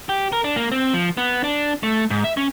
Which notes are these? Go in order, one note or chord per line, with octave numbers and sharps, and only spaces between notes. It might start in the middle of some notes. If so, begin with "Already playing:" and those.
G4
A#4
D4
A#3
C4
F3
B3
D4
A3
G#2
E5
C#4